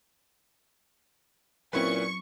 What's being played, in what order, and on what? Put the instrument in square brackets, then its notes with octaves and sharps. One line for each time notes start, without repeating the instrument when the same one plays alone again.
[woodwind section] A#2 [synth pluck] F#3 C4 [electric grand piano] C#4 E4 B4 [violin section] C#6